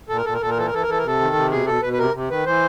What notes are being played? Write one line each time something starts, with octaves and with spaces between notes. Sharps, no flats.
A#2 A4
A#4
A#2 A4
A#4
A#2 A4
A#4
E3 A4
A#4
E3 A4
A#4
E3 A4
A#4
C3 A4
D#3
C3
B2 G#4
B2 A4
B2 B4
B4
C3 A#4
C3
D#3 B4
E3 C5